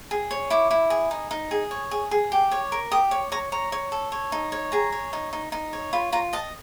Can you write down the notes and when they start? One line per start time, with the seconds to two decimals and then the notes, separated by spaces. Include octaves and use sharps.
0.11 G#4
0.31 C#5
0.50 E4 D6
0.71 E4
0.90 G#4
1.11 D#4
1.31 D#4
1.51 G#4
1.71 C#5
1.91 G#4
2.11 G#4
2.32 G4
2.51 C#5
2.72 A#4
2.91 G4 D#6
3.11 C#5
3.32 C#5 A#5
3.52 C#5 A#5
3.72 C#5
3.92 A4
4.12 C#5
4.32 D#4
4.52 C#5
4.72 G#4 A#5
4.92 C#5
5.13 D#4
5.33 D#4
5.52 D#4
5.73 C#5
5.93 F4 B5
6.12 F4 A#5
6.33 D#5 A5